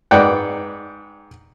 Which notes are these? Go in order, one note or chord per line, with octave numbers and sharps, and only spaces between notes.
G#2 B4 D5 F#5 G5